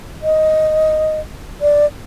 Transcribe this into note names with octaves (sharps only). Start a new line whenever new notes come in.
D#5
D5